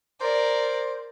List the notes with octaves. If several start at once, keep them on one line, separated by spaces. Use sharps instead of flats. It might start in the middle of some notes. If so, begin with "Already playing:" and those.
A#4 C5 D5